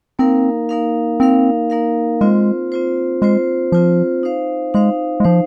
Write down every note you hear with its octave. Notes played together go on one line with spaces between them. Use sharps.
A#3 C4 D#4 A#4 F5
A#3 D#4 A#4 F5
A#3 C4 D#4 A#4 F5
A#3 D#4 A#4 F5
G#3 C4 F4 C5
C4 F4 C5
G#3 C4 F4 C5
F3 C4 F4 C5
D#4 C5 F5
G#3 D#4 C5 F5
G#3
F3 D#4 C5 F5